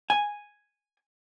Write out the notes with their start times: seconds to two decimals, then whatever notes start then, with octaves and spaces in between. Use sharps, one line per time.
0.10 G#5